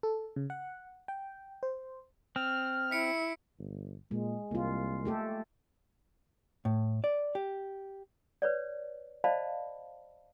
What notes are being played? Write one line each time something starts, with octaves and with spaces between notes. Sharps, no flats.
A4
C#3
F#5
G5
C5
C4 F6
E4 B6 C#7 D7
G1
A#2 G#3
C2 A#3 F4
A3 G4 A4
A2
D5
G4
B4 C#5 D5
C5 D5 D#5 F5 A5 B5